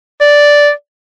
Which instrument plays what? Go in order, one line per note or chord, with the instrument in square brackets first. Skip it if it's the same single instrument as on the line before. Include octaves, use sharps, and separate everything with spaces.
[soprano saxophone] D5